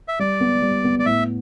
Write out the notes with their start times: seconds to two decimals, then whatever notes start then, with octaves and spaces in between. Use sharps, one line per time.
0.08 E5
0.19 G3 D5
0.40 B3
0.62 G3
0.84 B3
0.99 D5
1.06 A2 E5